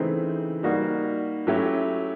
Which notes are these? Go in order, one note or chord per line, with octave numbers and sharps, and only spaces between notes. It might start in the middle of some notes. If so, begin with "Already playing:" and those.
Already playing: C#3 E3 A3 C4 D#4
G3 A#3 D#4 F#4
F#3 A3 C#4 E4 G4